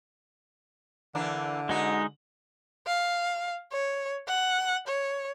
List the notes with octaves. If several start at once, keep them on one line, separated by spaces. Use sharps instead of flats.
D3 E3 A#3 D4
G#3 B3 D#4 F#4
F5
C#5
F#5
C#5